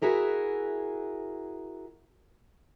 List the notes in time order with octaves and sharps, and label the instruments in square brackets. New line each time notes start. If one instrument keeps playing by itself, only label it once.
[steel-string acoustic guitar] E4 F#4 G#4 A#4 E5